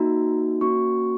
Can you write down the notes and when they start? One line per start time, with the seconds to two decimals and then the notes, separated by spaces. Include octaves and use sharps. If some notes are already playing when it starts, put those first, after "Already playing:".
Already playing: A#3 D#4 F#4 A#5
0.61 A#3 C#4 F#4 C#6